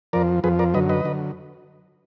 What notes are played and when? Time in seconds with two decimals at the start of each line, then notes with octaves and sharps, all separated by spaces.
0.13 F2 F3 A#4 D5
0.44 F2 F3 G#4 B4
0.59 A#4 D5
0.74 F#2 D3 F#3 B4 D#5
0.89 B4 D#5
1.05 D3 F#3